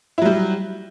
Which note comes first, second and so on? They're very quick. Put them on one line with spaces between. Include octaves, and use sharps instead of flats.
E4 F#3 G3